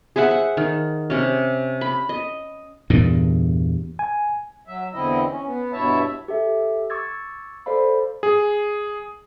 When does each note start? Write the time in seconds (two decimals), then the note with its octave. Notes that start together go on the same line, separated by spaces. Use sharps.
0.16 G#4 C5 E5 F#5
0.31 F#5
0.57 D#3
1.10 C3 C#4
1.81 B5
2.09 D#5
2.90 E2 G2 A#2
3.99 G#5
4.67 F#3 E5
4.94 E2 D3 C4 E4 D#5
5.30 C#4
5.47 B3
5.73 G2 B2 E4 C#5 E5 A5
6.28 G4 A4 E5
6.90 C#6 D6 E6 G#6 A6
7.66 A4 C5 D5 F5 B5
8.23 G#4